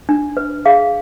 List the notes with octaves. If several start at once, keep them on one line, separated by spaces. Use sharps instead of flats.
D4
B4
G#4 F5